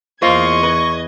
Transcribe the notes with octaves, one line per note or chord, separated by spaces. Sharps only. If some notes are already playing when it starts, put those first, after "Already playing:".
E2 A#3 F4 C5 D#5 C#6 G#6
B4